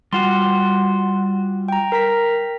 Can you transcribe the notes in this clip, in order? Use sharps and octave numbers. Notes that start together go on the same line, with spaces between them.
G3 F4 F#4 F#5 C6
G5 A#5
A#4 A#5 B6